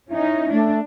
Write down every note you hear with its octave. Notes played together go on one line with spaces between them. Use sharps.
C#4 D#4 E4
A3 D4